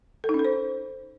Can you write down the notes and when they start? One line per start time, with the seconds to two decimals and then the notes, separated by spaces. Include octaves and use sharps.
0.24 A4
0.29 D#4
0.34 C#4
0.39 A4
0.45 C5